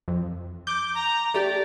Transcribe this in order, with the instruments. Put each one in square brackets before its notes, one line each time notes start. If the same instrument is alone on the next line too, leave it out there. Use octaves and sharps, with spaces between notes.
[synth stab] F2
[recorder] D6 [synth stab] G6
[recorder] A#5
[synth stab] A3 G4 [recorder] D5